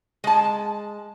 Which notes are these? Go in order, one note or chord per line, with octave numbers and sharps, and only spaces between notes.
G#3 A5